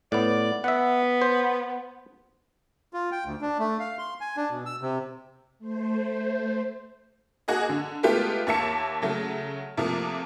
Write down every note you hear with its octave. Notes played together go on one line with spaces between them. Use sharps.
A2 B3 D5
B3 E5 F#5
C5
F4
G5
D2
D4
A3
F5
C6
G#5
D4
B2
E6
C3
A3 C5
A#3 F#4 G#4 D#5
D3
G#3 A3 B3 F4 G4
D#2 A#3 E5 A5 C#7
C#3 F#3 A3
C3 F3 A3 A#3